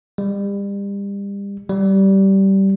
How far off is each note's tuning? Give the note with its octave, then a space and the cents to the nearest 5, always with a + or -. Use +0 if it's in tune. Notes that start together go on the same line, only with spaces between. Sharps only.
G3 +35
G3 -15